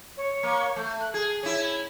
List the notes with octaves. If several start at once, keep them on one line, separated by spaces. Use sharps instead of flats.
C#5
A#3
A3 G6
F#6
G#4 G#6
C#4 E4